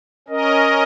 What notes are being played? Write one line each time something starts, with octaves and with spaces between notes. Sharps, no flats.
C#4 A#4 D#5